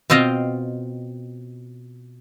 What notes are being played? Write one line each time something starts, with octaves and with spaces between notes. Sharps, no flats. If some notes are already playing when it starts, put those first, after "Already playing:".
B2 C4 F4 D#5 F5 G5